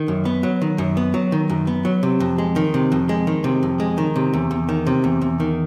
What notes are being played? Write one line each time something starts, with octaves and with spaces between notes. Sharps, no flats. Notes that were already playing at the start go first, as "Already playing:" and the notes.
Already playing: D#3
F#2
B3
F#3
D#3
F#2
B3
F#3
D#3
F#2
B3
F#3
C3
F2
G#3
D#3
C3
F2
G#3
D#3
C3
F2
G#3
D#3
C3
E2
E2
D#3
C3
E2
E2
D#3